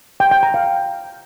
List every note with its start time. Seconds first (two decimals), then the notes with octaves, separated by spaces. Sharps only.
0.20 G5
0.31 G5
0.43 A#5
0.54 F5